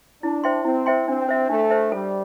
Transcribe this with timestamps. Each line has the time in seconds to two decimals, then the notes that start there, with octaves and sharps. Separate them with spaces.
0.22 D4 E4
0.44 C5 E5 G5 C6
0.64 C4 E4
0.86 C5 E5 G5 C6
1.08 C4 D4
1.29 C5 E5
1.49 A3 D4
1.70 C5 E5
1.92 G3 A4